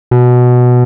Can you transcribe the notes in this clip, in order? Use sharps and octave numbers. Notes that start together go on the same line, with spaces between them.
B2